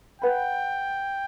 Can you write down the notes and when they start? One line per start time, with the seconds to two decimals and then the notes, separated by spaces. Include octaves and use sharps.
0.22 B4 F#5 G5 B5